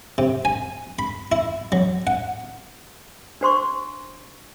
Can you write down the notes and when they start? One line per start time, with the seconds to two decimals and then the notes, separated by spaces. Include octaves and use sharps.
0.18 C3
0.45 G#5
0.99 B5
1.32 E4
1.72 F#3
2.07 F#5
3.41 D4 C5 C6 C#6